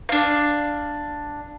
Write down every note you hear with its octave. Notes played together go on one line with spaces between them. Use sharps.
D4 F5